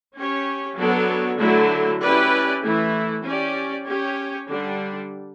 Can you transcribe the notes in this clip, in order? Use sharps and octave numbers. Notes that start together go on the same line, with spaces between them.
C#4 G4 C#5
F#3 B3 D4 A4 C#5
D3 F#3 A3 E4
C#4 E4 G4 B4 D5
E3 A3 E4
C#4 G4 D5
C#4 G4 C#5
D3 G3 D4